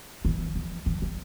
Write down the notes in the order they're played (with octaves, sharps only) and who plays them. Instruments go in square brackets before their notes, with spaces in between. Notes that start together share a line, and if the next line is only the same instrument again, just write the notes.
[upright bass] E3
F3
E3
F3